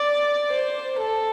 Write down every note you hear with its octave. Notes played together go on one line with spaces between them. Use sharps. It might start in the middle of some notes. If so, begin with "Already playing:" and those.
Already playing: D5
C5
A4